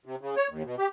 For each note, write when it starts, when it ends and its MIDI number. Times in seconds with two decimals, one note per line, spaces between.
0.05 0.16 48
0.21 0.35 49
0.36 0.48 73
0.49 0.63 39
0.64 0.76 47
0.78 0.87 67